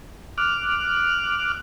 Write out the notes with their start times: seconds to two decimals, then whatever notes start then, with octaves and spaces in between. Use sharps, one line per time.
0.38 D6 F6 F#6